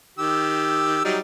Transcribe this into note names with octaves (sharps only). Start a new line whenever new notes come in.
D#3 G4 E6
F#3 G3 D#4